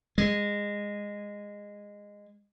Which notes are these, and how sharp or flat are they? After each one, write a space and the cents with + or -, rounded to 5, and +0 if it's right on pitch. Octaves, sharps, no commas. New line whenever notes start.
G#3 -20